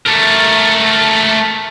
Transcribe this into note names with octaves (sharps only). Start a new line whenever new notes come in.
A3 A#4